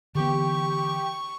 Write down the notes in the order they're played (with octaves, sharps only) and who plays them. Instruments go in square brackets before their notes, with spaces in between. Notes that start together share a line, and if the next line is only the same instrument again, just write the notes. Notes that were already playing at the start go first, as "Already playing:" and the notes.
[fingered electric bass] D3 E3 B3 [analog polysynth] G4 [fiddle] C#6